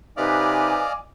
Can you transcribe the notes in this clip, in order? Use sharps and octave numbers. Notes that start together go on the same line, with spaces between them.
C3 D#4 B4 D5 D#5 F5 G#5 D6